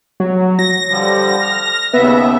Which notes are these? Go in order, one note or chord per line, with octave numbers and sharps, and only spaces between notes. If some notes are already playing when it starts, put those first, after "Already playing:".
F#3
A#6
D3 F3 G3
F6
D#2 C#3 B3 E5